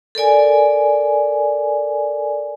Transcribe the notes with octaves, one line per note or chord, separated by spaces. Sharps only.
A4 A#4 D5 G#5